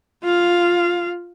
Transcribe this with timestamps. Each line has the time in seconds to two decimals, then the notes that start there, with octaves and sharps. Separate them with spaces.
0.23 F4 F5